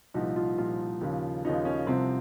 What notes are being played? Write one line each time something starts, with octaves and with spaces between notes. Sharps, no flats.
C2 A#2 F3 D#4
F4
C2 A#2 F3 F4
D#2 C#3 F3
D#2 C#3 F3 D#4
C#4
C2 C3 F3 C4